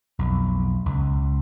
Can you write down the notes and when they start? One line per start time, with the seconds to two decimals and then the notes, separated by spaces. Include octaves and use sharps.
0.19 B1 F2
0.86 C#2